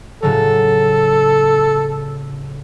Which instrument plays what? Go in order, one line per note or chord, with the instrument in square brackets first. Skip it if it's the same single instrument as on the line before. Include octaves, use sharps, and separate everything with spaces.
[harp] A2 C#3 F#3 [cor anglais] A4